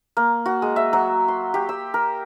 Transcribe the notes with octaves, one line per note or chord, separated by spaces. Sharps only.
A#3
F#4
G#3
E5
F#3
C6
G4
E6
A#4